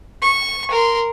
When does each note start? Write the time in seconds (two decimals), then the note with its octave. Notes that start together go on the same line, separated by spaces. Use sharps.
0.21 C#6
0.71 A#4 C6